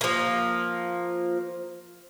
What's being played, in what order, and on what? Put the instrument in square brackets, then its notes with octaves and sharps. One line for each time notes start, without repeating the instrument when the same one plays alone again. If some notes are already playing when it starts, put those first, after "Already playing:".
[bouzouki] F3 A#3